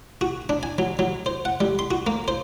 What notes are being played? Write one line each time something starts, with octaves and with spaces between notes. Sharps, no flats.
F#4
D4
G#5
F#3
F#3
C5
F#5
G3
C6
F#4
A#3
C5